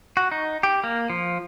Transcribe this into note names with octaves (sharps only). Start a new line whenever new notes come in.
F#4
D#4
G4
A#3
F3